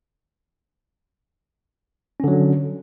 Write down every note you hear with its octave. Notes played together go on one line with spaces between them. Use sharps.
D3 F#3 C#4